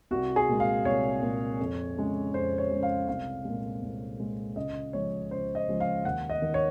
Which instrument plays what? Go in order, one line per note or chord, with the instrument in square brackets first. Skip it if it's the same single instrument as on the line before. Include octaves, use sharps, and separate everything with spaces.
[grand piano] C2 F#4
G#4
A#2 G#3
F5
C2 C#5
A#2 G#3
F2
C#3 G#3
F2 C5
C#5
C#3 G#3
F5
C2 F5
A#2 G#3
C2
A#2 G#3
C#2 D#5
C#3 F3 G#3 C#5
C#2 C5
D#5
C#3 F3 G#3
F5
D#2 F#5
D#5
D#3 A#3
C#5